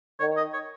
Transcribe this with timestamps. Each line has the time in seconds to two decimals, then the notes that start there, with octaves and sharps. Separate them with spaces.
0.20 D#3 C#5
0.37 D#5
0.53 C#5